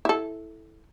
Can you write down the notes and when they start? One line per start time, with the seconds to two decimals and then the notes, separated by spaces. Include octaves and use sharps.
0.05 E4 A4